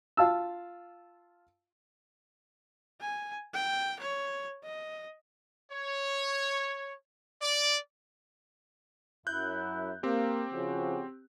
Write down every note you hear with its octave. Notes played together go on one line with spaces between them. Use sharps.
F4 F5 A5 E6
G#5
G5
C#5
D#5
C#5
D5
F#2 E4 F#6 G6
A#3 C4 G4
C#3 F3 F#4